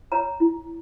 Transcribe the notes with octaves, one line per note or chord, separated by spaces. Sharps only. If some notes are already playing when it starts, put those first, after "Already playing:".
C#5 A#5
E4